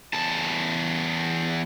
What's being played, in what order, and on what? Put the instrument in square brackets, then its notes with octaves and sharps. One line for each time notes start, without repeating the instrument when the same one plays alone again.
[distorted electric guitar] E2 A5